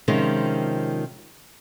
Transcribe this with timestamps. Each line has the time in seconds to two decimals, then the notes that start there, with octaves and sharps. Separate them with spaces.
0.08 C3 D#3 F3 G#3 C#4